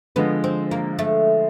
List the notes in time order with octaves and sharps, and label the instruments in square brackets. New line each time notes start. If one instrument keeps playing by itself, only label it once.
[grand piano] D3 F3 G#3 [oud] B3
[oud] C4
A#3
A3